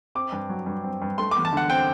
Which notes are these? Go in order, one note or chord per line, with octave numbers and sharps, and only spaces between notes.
C4 D6
G2
F#3
G2
C4
G2
A3 C6
D6
E2
A5
D3 F#5
C4 G5